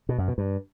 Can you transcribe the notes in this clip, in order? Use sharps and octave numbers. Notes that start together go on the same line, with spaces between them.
B2
F#2
B2
G2